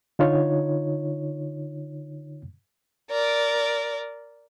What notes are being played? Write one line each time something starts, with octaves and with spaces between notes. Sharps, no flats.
D3 D#4 F4 C#5
A#4 D5